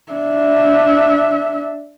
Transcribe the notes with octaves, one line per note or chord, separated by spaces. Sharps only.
D4 E5